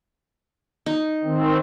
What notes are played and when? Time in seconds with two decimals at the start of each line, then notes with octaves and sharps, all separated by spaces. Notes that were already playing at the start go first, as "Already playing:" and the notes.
0.86 D#4
1.23 D#3 C4